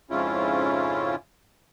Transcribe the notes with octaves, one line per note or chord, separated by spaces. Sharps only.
F2 G#2 C#3 C#4 E4 F4